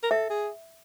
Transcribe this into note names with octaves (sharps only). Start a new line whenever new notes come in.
A#4
A4 E5
G#4